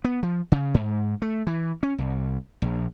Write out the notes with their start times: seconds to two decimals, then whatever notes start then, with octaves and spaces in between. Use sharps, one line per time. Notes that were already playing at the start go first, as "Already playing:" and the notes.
0.04 B3
0.23 F3
0.52 C#3
0.74 G#2
1.22 A3
1.47 E3
1.83 C#4
1.98 C2
2.62 A#1